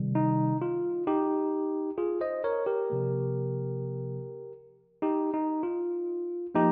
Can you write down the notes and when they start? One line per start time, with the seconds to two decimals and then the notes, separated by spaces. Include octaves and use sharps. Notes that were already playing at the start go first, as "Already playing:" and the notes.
Already playing: C3 D#3 G3
0.15 D#4
0.62 F4
1.07 D#4 G4
1.98 F4 G#4
2.21 C5 D#5
2.44 A#4 C#5
2.66 G4 A#4
2.90 C3 F3 A#3
5.02 D#4 G4
5.34 D#4
5.63 F4
6.55 F3 A#3 D#4 G4